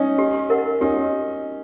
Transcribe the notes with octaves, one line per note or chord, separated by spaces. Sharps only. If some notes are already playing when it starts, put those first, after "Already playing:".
Already playing: C#4 D#4
G4
A#4 D#5 F#5
C#4 D#4 G4